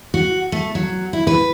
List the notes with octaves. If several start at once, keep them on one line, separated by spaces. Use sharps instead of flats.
F#4
A3
F#3
E4
B4